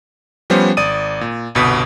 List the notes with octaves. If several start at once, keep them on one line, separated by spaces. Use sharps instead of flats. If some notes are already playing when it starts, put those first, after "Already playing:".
F3 G3 B3 C#4 C5
G#1 D5 D#6 D#7
A#2
G1 C2 B2 B5 D#6 B6